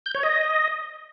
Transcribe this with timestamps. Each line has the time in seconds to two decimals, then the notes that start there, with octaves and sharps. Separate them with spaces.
0.06 G6
0.15 C#5
0.23 D#5